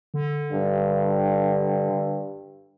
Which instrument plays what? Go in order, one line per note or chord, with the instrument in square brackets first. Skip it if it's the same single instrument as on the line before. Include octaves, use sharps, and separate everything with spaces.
[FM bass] D3
[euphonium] G2